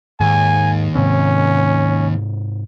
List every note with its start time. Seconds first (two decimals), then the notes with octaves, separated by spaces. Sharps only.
0.20 D#2 G#2 G#5
0.95 G#2 C3 C4 C#4